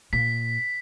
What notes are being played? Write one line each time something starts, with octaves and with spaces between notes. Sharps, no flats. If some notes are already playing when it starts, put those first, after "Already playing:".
A#2 B6